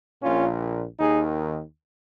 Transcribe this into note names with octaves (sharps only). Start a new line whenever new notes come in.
A#1 A#2 C#4 F4
D#2 D#3 D#4 G#4